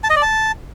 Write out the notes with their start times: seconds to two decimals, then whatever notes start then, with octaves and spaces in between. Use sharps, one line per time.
0.04 A5
0.10 D#5
0.16 D5
0.22 A5